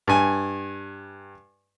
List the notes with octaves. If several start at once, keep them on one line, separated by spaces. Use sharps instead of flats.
G2 G#5